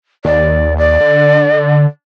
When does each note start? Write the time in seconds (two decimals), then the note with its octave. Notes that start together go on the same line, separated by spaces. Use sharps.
0.25 D#2 D5
0.78 D5
1.00 D3